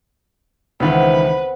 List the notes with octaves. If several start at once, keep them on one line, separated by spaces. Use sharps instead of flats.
C#2 D#3 E3 B3 C4 B4 F#5